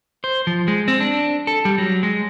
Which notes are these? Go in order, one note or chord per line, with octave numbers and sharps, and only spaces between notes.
C5
F3
G#3
C4
D4
A4
G3
F#3
G#3